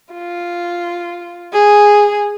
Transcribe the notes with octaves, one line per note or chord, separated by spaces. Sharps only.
F4
G#4